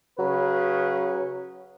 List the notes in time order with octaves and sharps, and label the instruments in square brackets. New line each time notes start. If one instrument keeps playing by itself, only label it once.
[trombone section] C#3 B4 [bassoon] F#3